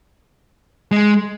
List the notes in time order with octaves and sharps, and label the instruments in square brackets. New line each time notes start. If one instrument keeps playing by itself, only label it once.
[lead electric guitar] G#3